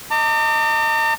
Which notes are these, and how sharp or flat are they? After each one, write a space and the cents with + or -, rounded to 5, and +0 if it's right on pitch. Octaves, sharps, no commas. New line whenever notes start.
D#5 +0 A#5 -45 D6 +0